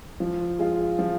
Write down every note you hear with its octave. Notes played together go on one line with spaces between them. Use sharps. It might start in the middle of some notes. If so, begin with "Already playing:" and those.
F3
G#3 F4
F3